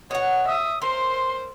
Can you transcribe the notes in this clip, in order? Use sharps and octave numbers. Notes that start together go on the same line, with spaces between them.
B2 C#5 F#5
E5 D#6
A#4 C5 C6